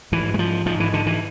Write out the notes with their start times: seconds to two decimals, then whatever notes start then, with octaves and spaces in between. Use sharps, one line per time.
0.12 G#2 E3
0.34 G#3
0.39 F3
0.66 G#2 F3
0.80 E3
0.93 D3
1.06 E3